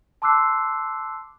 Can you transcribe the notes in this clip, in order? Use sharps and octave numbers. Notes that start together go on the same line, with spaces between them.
A5 C6 D6 E6 F#6 C7